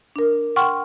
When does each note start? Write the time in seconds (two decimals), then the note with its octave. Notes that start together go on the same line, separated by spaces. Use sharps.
0.16 D4 A#4
0.56 F#5 G5 C6 C#6 F6